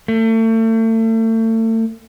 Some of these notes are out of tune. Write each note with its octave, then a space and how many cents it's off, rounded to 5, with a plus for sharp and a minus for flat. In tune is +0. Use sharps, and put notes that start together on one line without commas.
A3 +35